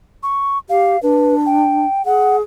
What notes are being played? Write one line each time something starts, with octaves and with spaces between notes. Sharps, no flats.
C#6
G4 F5
D4 B4
G5
G#4 F#5